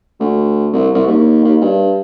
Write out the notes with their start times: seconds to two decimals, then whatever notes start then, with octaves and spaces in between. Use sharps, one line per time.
0.20 D2
0.73 C2
0.94 C2
1.07 D#2
1.44 D#2
1.62 G2